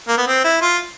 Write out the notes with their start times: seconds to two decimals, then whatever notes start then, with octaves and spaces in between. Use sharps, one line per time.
0.08 A#3
0.18 B3
0.27 C4
0.44 E4
0.62 F4